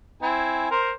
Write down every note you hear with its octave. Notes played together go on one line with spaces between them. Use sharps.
C4 E4 G#5
A#4 C5